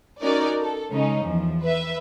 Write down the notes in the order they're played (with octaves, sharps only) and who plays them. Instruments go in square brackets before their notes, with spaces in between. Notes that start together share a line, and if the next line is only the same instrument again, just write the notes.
[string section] C#4 D#4 F#4 A#4 D5
A4
C#3 G#3 C#4 D#4
E2 F3
B4 E5